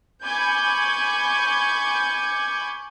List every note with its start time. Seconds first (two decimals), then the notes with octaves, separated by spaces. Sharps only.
0.23 G#5 B5 C#6 D6 G6 G#6